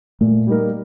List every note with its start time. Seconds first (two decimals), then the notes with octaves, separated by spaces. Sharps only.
0.20 A#2 A3
0.47 G3 A#3 D#4 A#4